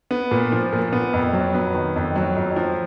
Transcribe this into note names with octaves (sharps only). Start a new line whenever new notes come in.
B3
A#2
F3
A#2
B3
F2
F#3
B3
D#3
F2
F#3
F2
F3